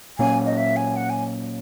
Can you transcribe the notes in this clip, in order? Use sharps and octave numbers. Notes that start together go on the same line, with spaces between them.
A#2 F#3 A#3 C#4 G#5
D#5
E5
G#5
F#5
G#5